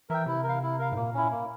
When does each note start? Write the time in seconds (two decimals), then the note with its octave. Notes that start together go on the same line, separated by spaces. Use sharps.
0.09 E3 A#4 E5 G5
0.26 C3 E4
0.44 A#4
0.49 F5
0.62 E4
0.79 A#4 F5
0.92 G#2
0.96 A#2 A#3
1.14 C#4 E4
1.31 A#3